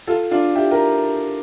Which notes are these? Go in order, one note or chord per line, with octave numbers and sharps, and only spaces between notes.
F4 A4
D4 F4
E4 G4
G4 A#4